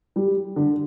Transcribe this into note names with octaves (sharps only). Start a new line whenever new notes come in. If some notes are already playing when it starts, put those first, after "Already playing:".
G3
D3